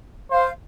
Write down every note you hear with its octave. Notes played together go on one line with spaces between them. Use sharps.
C5 F5